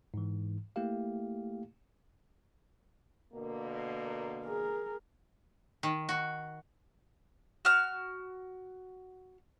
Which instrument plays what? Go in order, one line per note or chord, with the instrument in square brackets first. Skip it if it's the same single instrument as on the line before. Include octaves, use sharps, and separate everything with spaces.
[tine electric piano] G#2 E3
A3 A#3 E4 G4 F5
[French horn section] B2 D3 A#3
[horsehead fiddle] G#4 A#4
[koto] D#3
F#4
[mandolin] F#4 F6